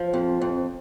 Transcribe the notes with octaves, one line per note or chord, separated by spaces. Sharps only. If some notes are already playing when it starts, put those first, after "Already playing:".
Already playing: F3
F2
F2